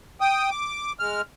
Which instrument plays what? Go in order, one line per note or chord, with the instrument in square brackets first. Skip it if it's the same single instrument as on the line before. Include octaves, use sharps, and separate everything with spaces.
[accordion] G5 D#6
D6
G#3 F6